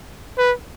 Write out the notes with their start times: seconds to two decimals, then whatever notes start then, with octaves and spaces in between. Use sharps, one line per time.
0.38 B4